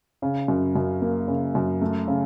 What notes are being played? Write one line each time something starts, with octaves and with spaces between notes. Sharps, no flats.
C#3
F#2
F#2
A#3
C#3
F#2
A3
C#3